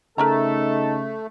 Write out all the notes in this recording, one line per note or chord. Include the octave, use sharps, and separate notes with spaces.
C#3 A3 D#4 A4 A#4 E5 A#5